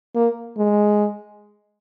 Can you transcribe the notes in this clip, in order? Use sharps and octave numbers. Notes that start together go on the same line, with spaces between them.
A#3
G#3